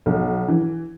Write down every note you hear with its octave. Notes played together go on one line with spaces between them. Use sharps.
B1
E3